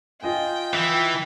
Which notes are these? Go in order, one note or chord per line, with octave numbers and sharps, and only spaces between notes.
F4 D#5 G5 G#5
E3